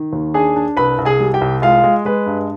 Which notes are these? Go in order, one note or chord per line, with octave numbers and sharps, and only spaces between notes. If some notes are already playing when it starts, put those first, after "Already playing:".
Already playing: D#3
D#2
D4 G#4 G#5
D4
C2 B4 B5
C2
G#4 G#5
G3
G4 G5
C2
G#3 F4 F5
G#3
G#3 B4
G2